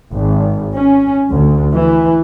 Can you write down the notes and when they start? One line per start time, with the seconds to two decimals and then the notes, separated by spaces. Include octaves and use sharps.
0.11 G#1
0.74 C#4
1.32 D2
1.75 E3